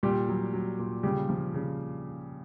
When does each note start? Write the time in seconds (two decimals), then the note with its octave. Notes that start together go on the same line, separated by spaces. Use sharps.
0.03 A#2 G3 G4
0.29 F#3
0.53 F#3
0.79 A#2
1.03 C#3 G3 G4
1.29 F3
1.54 C#3